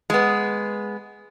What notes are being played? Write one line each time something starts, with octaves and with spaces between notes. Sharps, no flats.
G#3 B3